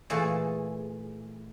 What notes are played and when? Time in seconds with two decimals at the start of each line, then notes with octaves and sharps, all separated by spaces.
0.10 A#2 E3 A3 G#4